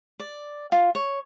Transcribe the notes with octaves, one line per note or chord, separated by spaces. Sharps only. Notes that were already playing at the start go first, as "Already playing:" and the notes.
D5
F4
C#5